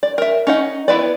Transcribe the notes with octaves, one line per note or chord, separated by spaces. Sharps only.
D5
A#4 E5
C#4 D#4 F#5
B3 E4 B4 D5